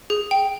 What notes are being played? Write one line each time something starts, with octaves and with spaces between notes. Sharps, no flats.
G#4
G5